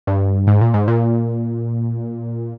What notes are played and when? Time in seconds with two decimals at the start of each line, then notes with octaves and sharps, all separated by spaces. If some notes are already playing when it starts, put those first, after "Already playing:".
0.07 G2
0.47 G#2
0.61 A#2
0.74 G#2
0.88 A#2